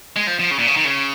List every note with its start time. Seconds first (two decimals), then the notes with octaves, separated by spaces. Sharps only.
0.16 G#3
0.27 F3
0.39 F3
0.51 C#3
0.59 A#2
0.67 C#3
0.76 D#3
0.85 C#3